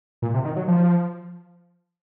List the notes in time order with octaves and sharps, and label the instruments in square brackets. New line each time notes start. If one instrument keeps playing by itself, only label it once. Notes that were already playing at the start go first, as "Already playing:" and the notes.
[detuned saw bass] A#2
C3
D#3
F#3
F3